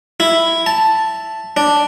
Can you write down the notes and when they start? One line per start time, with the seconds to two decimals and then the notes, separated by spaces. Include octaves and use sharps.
0.20 E4
0.66 A5
1.57 D4